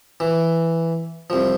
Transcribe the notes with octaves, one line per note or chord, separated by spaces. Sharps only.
E3
C2 F3